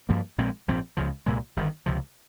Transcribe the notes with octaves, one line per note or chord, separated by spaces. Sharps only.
G2 F3 A#3
A#1 A#2 G#3 C4
A#1 G#2 F3 C4
C#2 C#3 F3
C2 A#2 G#3
G1 G2 D#3
C#2 C3 F3